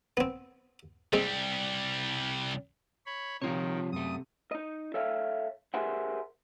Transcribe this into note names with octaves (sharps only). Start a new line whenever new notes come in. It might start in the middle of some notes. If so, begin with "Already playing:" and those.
B3 C4
C2 G3 G#3 C4
C#5 B5
C3 D#3 F3 F4 C#5
F#2 A3 D#6
D#4 D#5
A4 C#5 E5 F5
G4 G#4 A#4 C5 E5 F#5